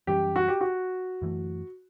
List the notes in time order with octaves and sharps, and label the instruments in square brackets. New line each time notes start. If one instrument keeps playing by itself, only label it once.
[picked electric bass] F#2 E3 G3 C#4 [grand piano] G4
[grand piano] F#4
G4
F#4
[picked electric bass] F#2 E3 A3